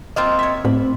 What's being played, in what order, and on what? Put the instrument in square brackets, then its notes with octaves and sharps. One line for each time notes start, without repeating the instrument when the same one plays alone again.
[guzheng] A#3 C4 F4 [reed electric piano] D#5
[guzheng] C#5 E5
[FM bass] A2 [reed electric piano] C4 [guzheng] B5